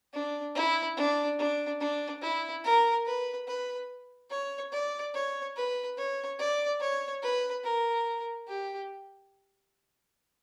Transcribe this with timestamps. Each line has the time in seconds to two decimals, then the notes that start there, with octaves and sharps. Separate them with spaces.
0.14 D4
0.55 E4
0.97 D4
1.39 D4
1.80 D4
2.22 E4
2.64 A#4
3.06 B4
3.47 B4
4.30 C#5
4.72 D5
5.14 C#5
5.56 B4
5.97 C#5
6.39 D5
6.80 C#5
7.23 B4
7.64 A#4
8.48 G4